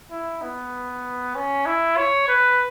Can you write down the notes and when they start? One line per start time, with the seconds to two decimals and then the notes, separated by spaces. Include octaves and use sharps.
0.11 E4
0.42 B3
1.35 C#4
1.66 E4
1.97 C#5
2.28 B4